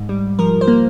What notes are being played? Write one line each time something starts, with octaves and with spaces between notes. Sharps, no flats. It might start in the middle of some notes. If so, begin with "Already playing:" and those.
Already playing: G#2
G3
F3 A#4
C5
A#3